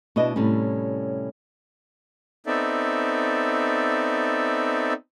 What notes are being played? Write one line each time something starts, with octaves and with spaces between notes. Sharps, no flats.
B2 D4 E4 D#5
A2 C3 G3 C#4
B3 C4 D#4 A4 D5 E5